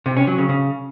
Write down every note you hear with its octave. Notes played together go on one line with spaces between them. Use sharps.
C3
C#4
F#3
C#3
C#3